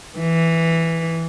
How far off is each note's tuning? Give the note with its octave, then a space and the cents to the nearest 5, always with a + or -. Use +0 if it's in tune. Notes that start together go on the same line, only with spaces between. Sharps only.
E3 +0